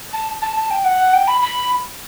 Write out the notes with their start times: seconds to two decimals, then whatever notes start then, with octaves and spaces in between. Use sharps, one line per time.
0.13 A5
0.41 A5
0.56 A5
0.70 G5
0.84 F#5
1.13 G5
1.27 B5
1.41 B5